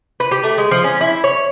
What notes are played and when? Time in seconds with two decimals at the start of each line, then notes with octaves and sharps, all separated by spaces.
0.20 B4
0.31 G4
0.43 A3
0.58 G#3
0.71 F3
0.84 C#4
1.01 E4
1.24 C#5